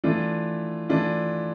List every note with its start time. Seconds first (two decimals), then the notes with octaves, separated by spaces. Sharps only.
0.04 E3 A3 D4 F4
0.89 E3 A3 D4 F4